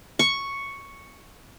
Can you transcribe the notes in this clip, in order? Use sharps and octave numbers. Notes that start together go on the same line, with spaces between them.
C#6